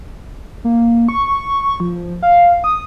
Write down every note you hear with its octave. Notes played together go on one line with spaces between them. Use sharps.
A#3
C#6
F3
F5
D#6